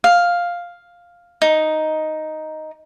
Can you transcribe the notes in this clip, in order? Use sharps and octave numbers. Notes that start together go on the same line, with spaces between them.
F5
D#4